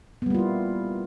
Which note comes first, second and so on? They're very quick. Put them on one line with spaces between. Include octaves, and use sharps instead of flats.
B3 G3 A#3 F4 E4